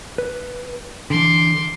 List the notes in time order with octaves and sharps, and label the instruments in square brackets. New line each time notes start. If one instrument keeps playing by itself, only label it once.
[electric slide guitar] B4
[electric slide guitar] D3 E3 [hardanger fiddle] C6 D6